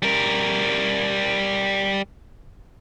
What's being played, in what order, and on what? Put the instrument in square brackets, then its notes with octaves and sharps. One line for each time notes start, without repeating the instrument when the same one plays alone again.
[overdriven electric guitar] G3 A#4